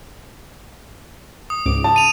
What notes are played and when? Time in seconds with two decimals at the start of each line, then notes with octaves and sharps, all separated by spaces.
1.50 D#6
1.66 C#2 G#2 D6
1.84 A5
1.96 D#7 F7